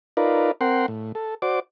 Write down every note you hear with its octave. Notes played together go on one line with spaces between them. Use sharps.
D#4 F4 A#4 B4 D5
C4 A#4 F#5 G5 C6
A2
A4
F#4 C5 D5 D6